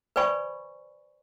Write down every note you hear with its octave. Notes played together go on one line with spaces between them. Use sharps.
B4 C5 D5 G#5 B5 C#6